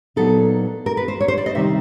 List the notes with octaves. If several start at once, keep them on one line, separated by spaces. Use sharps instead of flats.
A#2 F#3 B3 D#4 A4
A#4
B4
C5
C#5
C5
D5
D#5
C3 D#3 G3 C4 D#4 E5